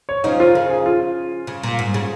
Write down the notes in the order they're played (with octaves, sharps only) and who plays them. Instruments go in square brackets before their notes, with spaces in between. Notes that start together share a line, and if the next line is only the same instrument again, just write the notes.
[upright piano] C#5
[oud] C#3 F3 [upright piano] D#4
[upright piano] F4
[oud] C#3 [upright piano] A#4
[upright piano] G#4
F4
[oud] C#3
A#2
G#2
C#3